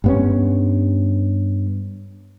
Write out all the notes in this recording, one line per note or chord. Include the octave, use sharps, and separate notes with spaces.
G2 B3 C#4